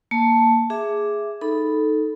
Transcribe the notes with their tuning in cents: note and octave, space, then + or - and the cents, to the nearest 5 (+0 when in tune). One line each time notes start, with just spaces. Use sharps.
A#3 +0 A5 +0
G#4 +0 E5 +5 D6 +0
D#4 +0 A4 -5 B5 +0